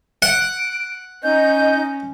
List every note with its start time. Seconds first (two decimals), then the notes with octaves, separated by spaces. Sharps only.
0.22 F#5 D7
1.23 C#4 D#4 D#5 G6